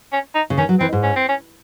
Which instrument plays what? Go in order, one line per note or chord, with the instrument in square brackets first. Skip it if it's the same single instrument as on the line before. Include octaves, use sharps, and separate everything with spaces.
[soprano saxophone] C#4
D#4
[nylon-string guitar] C#3
[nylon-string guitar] D#3 [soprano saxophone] C#4
[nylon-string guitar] F#3
[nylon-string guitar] E3 [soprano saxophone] C4
[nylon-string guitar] G#2
[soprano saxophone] C#4
C4
C#4